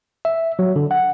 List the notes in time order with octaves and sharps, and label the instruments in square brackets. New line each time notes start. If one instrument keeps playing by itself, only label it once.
[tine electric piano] E5
F#3
D3
F#5